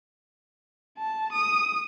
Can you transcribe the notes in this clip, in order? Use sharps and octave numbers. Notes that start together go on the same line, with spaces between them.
A5
D#6